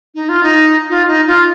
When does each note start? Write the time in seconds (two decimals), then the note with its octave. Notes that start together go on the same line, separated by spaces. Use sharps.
0.15 D#4
0.29 F4
0.43 D#4
0.90 F4
1.08 D#4
1.27 F4